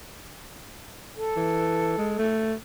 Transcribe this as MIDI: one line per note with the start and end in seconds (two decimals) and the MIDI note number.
1.16 2.26 69
1.36 1.97 52
1.98 2.16 56
2.19 2.54 57